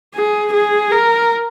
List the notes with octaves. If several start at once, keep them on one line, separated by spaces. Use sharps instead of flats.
G#4
G#4
A#4